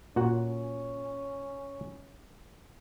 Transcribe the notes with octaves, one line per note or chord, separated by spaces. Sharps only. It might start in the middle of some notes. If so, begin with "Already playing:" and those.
A#2 C#4 F#4 F#5